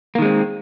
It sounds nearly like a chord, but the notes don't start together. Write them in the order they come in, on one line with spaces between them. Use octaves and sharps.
A#3 D#3 G#3 C4